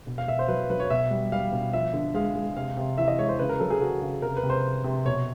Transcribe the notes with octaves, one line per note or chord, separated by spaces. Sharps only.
B2
F5
B2 E5
C5
F#3 B4
F#3 B4
C#5
B2 E5
G3
G3 F5
B2
F3 E5
D3
G#3 F5
G#3
C3 F5
C3
E3 E5
D#5
G#3 C#5
C5
C#3 B4
A#4
F#3 A4
G#4
C#3 F#4
C#3
C3 A#4
B4
C3
C5
C3
C3
B2 C#5